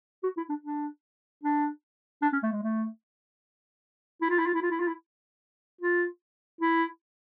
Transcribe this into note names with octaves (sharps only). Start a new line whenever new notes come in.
F#4
E4
D4
D4
D4
D4
C#4
A3
G#3
A3
E4
F4
E4
F4
E4
F4
E4
F4
E4
F4
E4